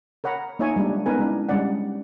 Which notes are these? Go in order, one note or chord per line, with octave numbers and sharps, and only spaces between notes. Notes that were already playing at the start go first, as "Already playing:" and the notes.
A#4 C#5 F#5 A#5 B5
A#3 D#4 F4 C#5 E5 G#5
G3 G#3 A#3 D4
B3 C#4 D#4 A#4 B4 G#5
G#3 D4 E4
G3 G#3 C#4 D4 D5 F#5